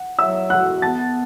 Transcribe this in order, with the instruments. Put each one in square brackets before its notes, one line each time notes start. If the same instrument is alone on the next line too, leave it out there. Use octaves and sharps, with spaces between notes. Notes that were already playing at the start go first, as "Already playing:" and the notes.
Already playing: [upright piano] F#5
[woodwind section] F#3 [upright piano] E5 E6
[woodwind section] F#4 [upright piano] F#5 F#6
[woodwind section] B3 [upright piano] A5 A6